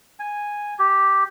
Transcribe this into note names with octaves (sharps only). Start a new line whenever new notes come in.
G#5
G4